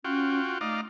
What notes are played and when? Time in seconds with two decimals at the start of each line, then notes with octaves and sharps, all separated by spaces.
0.05 C#4 F4 F#4 G5
0.61 A3 D#4 D5 F5